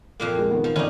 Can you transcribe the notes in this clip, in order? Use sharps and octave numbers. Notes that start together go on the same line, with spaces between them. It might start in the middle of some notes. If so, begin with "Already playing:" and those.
F2 A#2 A#3
G#3
D#3 B3
F3
G1 C#4 D#4 D5